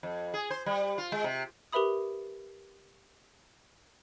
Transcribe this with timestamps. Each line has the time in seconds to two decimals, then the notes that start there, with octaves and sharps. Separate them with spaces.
0.03 F2
0.34 G#4
0.50 C5
0.66 G3
0.98 F4
1.12 G#3
1.24 C3
1.72 G4 A#4 B4 E5 B5 D#6